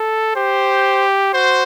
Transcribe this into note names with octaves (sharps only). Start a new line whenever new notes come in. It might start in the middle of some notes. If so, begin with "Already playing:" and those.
Already playing: A4
G4 C5
F#4 C5